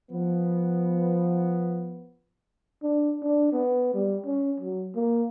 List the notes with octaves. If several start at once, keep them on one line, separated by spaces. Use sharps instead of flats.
F3 B3
D4
D4
B3
G3
C#4
F#3
A#3